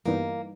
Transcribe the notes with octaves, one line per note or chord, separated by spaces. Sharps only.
G2 E3 G3 A#3 B3 D#4